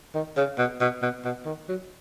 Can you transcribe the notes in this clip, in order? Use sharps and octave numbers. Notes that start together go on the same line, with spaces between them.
D#3
C#3
B2
B2
B2
B2
D#3
F#3